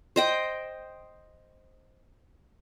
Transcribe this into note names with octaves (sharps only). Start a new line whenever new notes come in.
C5 D#5 G5